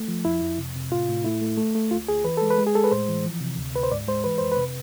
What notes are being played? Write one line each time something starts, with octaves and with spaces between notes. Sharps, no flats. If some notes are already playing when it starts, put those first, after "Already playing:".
Already playing: A3
F3
F2 E4
F2
C3
C3
A2 F4
A2
A3 E4
A3
A3
A3
D2 F4
D2 G#4
E3 B4
G#3 A4
B4
G#3
G#4
G#3 A4
B4
A2 C5
E3
F3
C3
D2
D2 B4
C5
G#2 D5
G#3 C5
E3 B4
F2 C5
B4
C3